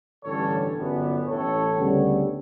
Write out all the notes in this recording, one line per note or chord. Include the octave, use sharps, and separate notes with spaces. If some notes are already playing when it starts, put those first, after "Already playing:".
A1 G2 D3 G3 C#4 A4 C#5
G1 F#2 D3 G3 B3
A1 A2 E3 A4 C#5
D2 C#3 G3 B3